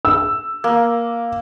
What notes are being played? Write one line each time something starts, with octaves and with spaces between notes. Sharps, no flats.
E6
A#3